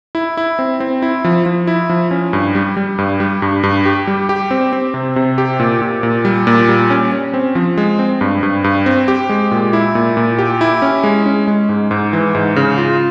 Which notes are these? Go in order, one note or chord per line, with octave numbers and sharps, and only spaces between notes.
E4
E4
C4
C4
E4
F3
F3
E4
F3
C#4
G2
G3
G3
G2
G3
G2
G2
G4
G3
G4
C4
C4
C3
C3
G4
A#2
A#2
A#2
G3
A#2
G3
C#4
C#4
C4
F3
G#3
C4
G2
G2
G2
C4
G4
G#3
A#2
E4
A#2
A#2
G4
E4
C#4
G#3
C#4
G#3
G#2
G#2
E3
G#2
C#3
F4